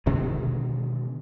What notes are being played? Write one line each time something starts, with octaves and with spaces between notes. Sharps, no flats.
B2 D3 D#3 G#3